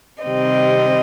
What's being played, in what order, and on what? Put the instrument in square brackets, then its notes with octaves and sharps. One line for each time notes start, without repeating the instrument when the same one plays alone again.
[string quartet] C3 D#3 G3 C4 D#5